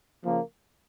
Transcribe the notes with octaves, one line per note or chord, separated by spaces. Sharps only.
C#3 F3 A#3